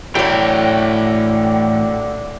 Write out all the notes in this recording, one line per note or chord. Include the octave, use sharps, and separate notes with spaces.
A2 D3 E3 F#3 C#5 G5